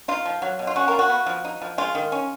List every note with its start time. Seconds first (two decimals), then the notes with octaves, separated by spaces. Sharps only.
0.08 D#4 F4
0.25 F3
0.42 F#3
0.59 B2
0.67 F4
0.76 C#4 F#4
0.88 F4 A#4
0.99 F#4
1.09 B3
1.26 F3
1.45 D#4
1.62 F3
1.78 G#3 F4
1.95 D#3
2.12 C#4